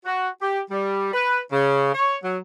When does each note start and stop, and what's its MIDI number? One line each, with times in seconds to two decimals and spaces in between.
0.05 0.28 66
0.42 0.59 67
0.71 1.10 55
1.14 1.39 71
1.52 1.91 49
1.94 2.16 73
2.23 2.37 54